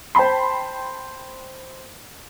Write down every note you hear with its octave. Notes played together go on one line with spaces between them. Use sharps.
C5 G5 A5 B5 C6